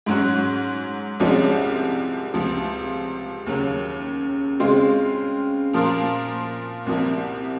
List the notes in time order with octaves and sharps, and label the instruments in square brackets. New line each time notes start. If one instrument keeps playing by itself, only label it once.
[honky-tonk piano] G#2 F#3 C#4 F#4
C2 C3 F3 G#3 C#4
C#2 C3 F3
D#2 C#3 F#3
C#3 G#3 C4 F4
A#2 F3 A#3 F4 A#4
C2 C3 F3 A#3